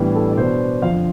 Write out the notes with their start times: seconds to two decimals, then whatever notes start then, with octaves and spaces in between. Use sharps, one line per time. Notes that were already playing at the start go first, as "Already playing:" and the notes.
Already playing: A2 E3 G3 B3 D4
0.16 A4
0.31 D5
0.37 B2 B3 D4 C5
0.82 F2 D3 F3 F5